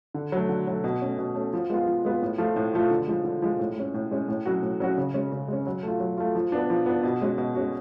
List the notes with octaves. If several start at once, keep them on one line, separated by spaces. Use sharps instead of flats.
D3
F#3 A3
D3
F#3 A3
B2
A3 C#4
B2
A3 C#4
F3
G#3 B3 F4
F3
G#3 B3 F4
A2
F3 A3 F4
A2
F3 A3 F4
D3
F3 G#3
D3
F3 G#3
A2
G#3 C#4
A2
G#3 C#4
A2
F#3 C#4 F#4
A2
F#3 C#4 F#4
C#3
G#3 C#4
C#3
G#3 C#4
F#3
A3 F4
F#3
A3 F4
F3
B3 D4
F3
B3 D4
B2
G#3 C#4 F#4
B2
G#3 C#4 F#4